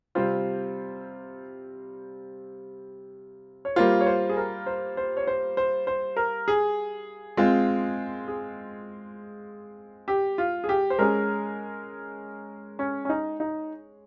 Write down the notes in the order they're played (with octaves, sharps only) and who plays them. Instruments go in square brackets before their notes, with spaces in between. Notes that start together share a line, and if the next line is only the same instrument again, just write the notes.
[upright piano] C3 G3 C4 F4 [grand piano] C5
[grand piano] C#5
[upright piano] G3 A#3 F4 [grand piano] C5
[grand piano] C#5
C5
G#4
A#4
C5
C5
C#5
C5
C5
C5
A#4
G#4
[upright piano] G#3 C4 F4
[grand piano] G#4
G4
F4
G#4
G4
C5
[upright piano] G#3 C#4 G#4 [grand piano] A#4
[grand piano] C#4
C#4
D#4
D#4